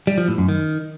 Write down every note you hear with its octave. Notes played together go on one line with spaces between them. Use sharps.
G3
F3
A2
F#2
D#3